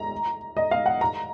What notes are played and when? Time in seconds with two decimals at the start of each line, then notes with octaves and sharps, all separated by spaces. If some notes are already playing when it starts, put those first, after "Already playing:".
Already playing: A#5
0.57 D#5
0.71 F5
0.86 F#5
1.01 A#5